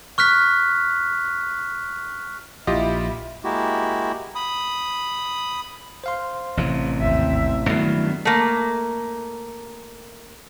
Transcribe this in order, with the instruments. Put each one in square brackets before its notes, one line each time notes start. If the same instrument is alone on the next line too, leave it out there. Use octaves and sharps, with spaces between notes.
[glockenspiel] C#6 F6 F#6 B6
[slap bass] A#1 [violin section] E4 [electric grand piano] F4 G4 D#5
[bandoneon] G#3 A#3 E4 F#4 G4
B5 D#6
[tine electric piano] C5 F5 C6
[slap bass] A1 C3 E3
[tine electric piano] G#1 D#2 [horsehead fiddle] C4 E5
[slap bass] G2 D#3 F#3 [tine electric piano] A3 E4 C7 [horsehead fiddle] B3
[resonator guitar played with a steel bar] A3 A#3